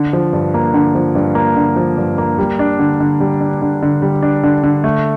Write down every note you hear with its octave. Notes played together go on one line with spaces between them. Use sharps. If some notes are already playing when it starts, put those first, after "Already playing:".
Already playing: D3
F3
G2
A#3
D3
F3
G2
A#3
D3
F3
G2
A#3
G3
D4
D3
D3
G3
D4
D3
D3
G3
D4
D3
D3
A3